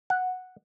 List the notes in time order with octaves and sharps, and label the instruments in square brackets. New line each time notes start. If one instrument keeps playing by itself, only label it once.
[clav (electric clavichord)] F#5